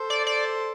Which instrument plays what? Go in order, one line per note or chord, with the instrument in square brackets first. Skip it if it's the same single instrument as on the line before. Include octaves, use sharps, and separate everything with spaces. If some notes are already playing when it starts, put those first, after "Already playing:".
Already playing: [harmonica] A4 C5
[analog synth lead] D5
D5